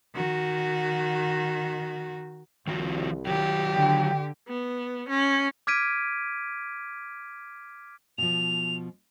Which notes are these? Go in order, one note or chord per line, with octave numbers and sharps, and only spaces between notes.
D#3 F#4
C2 D#3 F3 F#4
D#3 F#3 G4
D3 G5
B3
C#4
D6 F6 G#6 B6 D7 D#7
B2 F3 F7